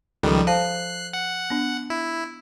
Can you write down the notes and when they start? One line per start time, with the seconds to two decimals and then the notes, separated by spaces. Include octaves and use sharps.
0.23 C#2 D#3 F3 G3 A4
0.47 C5 F5 A5 F#6 C7
1.13 F#5
1.50 B3 D4
1.90 E4